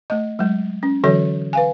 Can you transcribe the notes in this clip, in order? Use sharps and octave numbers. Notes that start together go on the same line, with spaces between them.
A3 D#5
F#3 G#3
C#4
D3 E3 F#3 F#4 A4 C#5
B4 F5 G#5